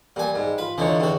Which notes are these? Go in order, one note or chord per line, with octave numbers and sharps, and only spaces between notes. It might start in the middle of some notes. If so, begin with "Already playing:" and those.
A#2 G3 G#5
G#2
F4 B4
D3 E3 D#4 C#5
E2 C3 F#4